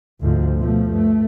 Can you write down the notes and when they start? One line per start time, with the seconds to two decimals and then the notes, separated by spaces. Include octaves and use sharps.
0.20 D2 G#2 F3
0.56 B2 F3 A3
0.89 G2 A3